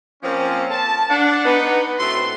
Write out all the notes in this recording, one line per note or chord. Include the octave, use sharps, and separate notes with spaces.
F3 A#3 C4 C#4
A5
D4 F#5
B3 D#4
A2 A3 C4 F#4 E5 C6